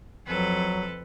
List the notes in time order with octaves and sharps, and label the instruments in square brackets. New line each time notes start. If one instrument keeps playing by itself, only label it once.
[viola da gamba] F2 A4 B4 [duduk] F#3